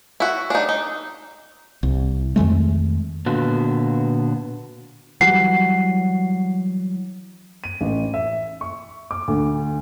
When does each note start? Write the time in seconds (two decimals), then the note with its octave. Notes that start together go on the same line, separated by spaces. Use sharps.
0.20 E4 F#4
0.50 D4 D#4
0.69 D#4
1.83 C2
2.36 F2 D#3 G#3 A3
3.26 A#2 D3 B3 F#4
5.21 E3 F#3 G3 F#5 C7
7.64 D#7
7.81 A1
8.14 E5
8.61 C#6
9.11 D6
9.28 D2